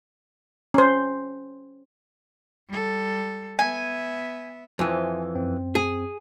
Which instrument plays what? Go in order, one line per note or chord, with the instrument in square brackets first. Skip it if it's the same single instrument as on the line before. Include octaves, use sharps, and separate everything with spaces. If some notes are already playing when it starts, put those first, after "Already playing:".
[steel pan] C#4 C5
[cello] G3 A4
[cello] B3 E5 [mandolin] G#5
[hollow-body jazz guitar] F2 E3 [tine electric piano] C5 E5 G#5
[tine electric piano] F#2 C4
[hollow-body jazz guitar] G#4